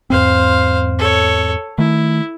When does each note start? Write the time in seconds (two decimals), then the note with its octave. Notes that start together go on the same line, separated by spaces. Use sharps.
0.10 E2 G#2 C4 C5 F5
0.99 A4 C#5
1.78 D#3 A3 E4